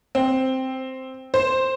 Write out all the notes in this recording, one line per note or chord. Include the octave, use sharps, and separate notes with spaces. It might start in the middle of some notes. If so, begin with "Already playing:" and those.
C4
C5